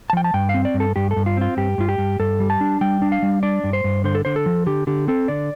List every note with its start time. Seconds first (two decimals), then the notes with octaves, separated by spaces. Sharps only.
0.10 A5
0.13 F3 G5
0.24 A5
0.34 G2 G5
0.49 F5
0.54 C4
0.65 D5
0.74 G2
0.80 A4
0.96 G2 G4
1.11 A4
1.16 G2
1.26 F4
1.37 C4 F4
1.57 G2 G4
1.78 G2 F4
1.89 G4
1.98 G2
2.19 G2 A4
2.40 G3
2.50 A5
2.61 D4
2.81 G3 G5
3.02 D4
3.12 F5
3.23 G3
3.43 D4 D5
3.64 G2
3.73 C5
3.84 G2
4.04 D3 C5
4.15 A4
4.25 D3 C5
4.36 A4
4.46 F3
4.66 D3 G4
4.87 D3 G4
5.08 C4 A4
5.28 D3 D5